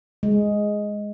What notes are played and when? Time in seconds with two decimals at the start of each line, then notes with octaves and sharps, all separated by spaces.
0.23 G#3